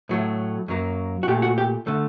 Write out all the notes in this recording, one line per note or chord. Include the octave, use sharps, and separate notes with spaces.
A2 F#3 A3
F#2 F#3 A#3
F#4
A#2 A3 G4
F#4
G4
D3 A3